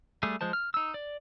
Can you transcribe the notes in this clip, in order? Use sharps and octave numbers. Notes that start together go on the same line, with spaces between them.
G3 A3 G#4
F3 G#3 C5 A5
F6
D#4 E6
D5